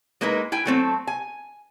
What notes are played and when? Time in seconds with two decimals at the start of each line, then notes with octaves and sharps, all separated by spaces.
0.21 G#3 A#3 D#4 E4 B4
0.52 E4 G5 G#5
0.65 F#3 A3 C4
1.07 G#5